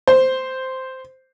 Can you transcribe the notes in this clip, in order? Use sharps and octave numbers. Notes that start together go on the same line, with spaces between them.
C5